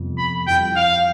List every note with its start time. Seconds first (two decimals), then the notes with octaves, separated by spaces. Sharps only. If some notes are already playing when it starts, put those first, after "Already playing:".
Already playing: F2 C3 G3 B3
0.18 B5
0.47 F2 E3 G3 G5
0.76 F5